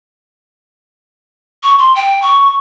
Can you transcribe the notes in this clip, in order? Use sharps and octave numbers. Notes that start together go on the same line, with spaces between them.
C#6
C6
G5
C#6